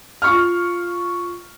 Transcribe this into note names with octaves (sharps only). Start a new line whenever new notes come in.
F4 C#6 F6